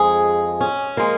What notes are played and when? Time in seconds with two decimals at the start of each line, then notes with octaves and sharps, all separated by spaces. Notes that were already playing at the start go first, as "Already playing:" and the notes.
Already playing: F2 F3 G#3 G#4
0.61 C#4
0.97 F3 G#3 A#3